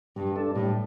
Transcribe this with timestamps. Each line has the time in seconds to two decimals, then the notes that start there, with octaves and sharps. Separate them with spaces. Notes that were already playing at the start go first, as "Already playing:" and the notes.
0.16 G2 G3
0.36 D4 A4
0.55 A2 G3